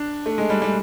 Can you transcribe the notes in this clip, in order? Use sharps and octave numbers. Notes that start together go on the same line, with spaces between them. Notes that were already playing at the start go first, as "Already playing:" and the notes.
Already playing: D4
A3
G#3
G3
G3